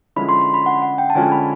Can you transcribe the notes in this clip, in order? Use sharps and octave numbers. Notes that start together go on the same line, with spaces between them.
D3 F3 G#3 C#4 E4 B5
C6
C6
B5
F#5
F#5
G5
A5
D3 F3 G#3 C#4 F4 G#5
B5